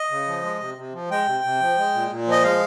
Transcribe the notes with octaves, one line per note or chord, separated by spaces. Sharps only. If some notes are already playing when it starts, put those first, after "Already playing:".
Already playing: D#5
C#3
F3
G#3
C3
C3
F3
G#3 G5
C3
C3
F3
G#3
A#2
A#2
F3 D#5
G#3 F5